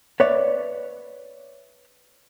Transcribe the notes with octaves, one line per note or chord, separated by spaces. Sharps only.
B4 C#5 D5 E5